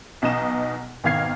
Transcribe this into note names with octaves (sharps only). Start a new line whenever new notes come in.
B1 B2 D#4 D#5 A#5 E7
G#1 B2 D#3 F5 G#6 C7